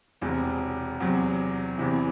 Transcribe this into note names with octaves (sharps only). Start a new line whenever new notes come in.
E1 E2 C3
E2 C3 F#3
E2 C3 E3